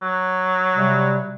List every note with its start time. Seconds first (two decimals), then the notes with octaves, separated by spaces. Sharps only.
0.02 F#3
0.75 C3 G3